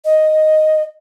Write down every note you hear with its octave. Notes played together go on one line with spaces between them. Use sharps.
D#5